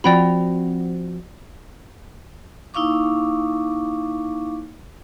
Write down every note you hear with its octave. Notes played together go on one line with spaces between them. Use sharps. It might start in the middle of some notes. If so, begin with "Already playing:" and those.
F3 C4 F#4 D5 G5 B5
A#3 D#4 E4 F5 C#6 D6